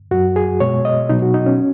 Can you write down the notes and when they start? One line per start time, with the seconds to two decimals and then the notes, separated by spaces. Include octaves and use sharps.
0.11 F#2 F#3 F#4
0.36 G#4
0.60 B2 G#3 C#5
0.85 D#5
1.09 B2 F#3 D#4
1.22 F#4
1.34 D#4
1.46 C#4